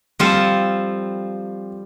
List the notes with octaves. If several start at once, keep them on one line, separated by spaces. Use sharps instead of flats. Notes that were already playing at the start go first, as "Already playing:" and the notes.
F3 G3 C4 F4 A4